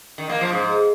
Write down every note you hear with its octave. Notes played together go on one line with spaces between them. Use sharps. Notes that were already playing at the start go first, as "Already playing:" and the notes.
D#3
A#3
F3
G#2